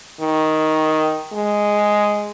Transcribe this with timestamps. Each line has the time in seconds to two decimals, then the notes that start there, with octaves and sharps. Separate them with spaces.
0.21 D#3
1.34 G#3